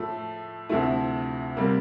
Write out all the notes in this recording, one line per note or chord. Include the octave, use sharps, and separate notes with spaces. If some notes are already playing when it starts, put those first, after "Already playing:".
Already playing: A2 F3 A3
D2 C3 F3 A3 E4
C3 G3 A#3